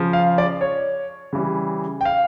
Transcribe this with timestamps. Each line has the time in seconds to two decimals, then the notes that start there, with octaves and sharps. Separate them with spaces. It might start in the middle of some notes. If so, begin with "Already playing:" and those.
Already playing: C#3 F3
0.13 F5
0.38 D5
0.61 C#5
1.33 C#3 E3 G3
2.01 G5
2.05 F5